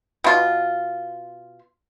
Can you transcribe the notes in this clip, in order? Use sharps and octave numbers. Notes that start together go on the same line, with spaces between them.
B2 F4